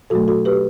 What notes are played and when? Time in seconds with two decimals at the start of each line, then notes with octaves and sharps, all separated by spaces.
0.10 B2 F#3 A3 F#4 A4
0.28 F#4 A4
0.45 G4 B4